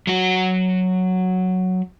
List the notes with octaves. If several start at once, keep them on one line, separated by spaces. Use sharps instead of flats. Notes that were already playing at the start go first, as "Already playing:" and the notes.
F#3 F#4